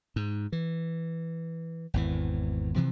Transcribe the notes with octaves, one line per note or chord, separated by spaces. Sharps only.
G#2
E3
G#1 E2 E3
C3 E3 F3